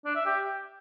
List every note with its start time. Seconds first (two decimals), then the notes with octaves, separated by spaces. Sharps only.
0.05 D4
0.15 E5
0.25 G4